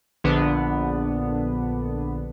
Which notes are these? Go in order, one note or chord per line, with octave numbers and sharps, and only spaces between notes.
A#1 D3 B3 D4